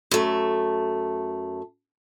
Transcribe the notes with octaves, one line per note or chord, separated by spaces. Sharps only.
F#2 A3